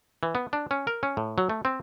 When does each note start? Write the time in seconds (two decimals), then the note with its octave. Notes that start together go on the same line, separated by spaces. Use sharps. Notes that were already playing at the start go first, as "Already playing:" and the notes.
0.23 E3
0.35 B3
0.53 D4
0.71 C#4
0.87 A#4
1.03 C#4
1.17 A2
1.38 F#3
1.50 A3
1.65 C4